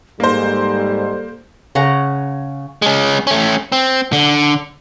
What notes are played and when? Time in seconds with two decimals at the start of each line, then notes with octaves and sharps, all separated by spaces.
0.20 G#2 G3 A#3 A4 C5
1.75 C#3 C#4 F#5 A#5
2.82 G#3 C#4
3.27 A3 C#4
3.72 C4
4.13 D3